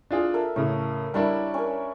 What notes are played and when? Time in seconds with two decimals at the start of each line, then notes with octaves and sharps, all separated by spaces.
0.11 D4 F4 G#4
0.34 A4 A#4 E5
0.56 A2 C#3 C#5
1.14 G3 D4 E4 A#4 C#5 A5
1.54 C#4 A#4